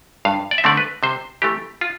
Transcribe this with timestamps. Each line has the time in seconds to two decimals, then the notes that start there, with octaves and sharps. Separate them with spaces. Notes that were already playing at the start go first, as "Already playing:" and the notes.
0.25 G2 F5
0.51 D5
0.58 E5
0.64 D3 A3 C4 D5
0.77 B4
1.03 C3 C5
1.42 E3 A3 G4
1.81 F4